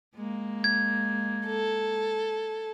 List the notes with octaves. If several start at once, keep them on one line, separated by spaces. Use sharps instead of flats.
G#3 A#3
G#6
A4